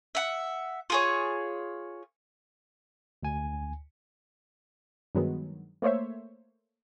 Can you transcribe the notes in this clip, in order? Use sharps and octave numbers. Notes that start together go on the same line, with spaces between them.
E5 F#5
F4 G#4 C#5
D2 G#5
G2 D#3 F#3 G#3 B3
A3 A#3 C5 C#5 E5